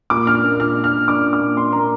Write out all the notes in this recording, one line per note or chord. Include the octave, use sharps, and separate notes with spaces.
A#2 D6
D4 F6
A#3
A#2 F6
D4
F6
A#2
D4 D6
A#2
D6
A#2
D4 C6
A#3 A#5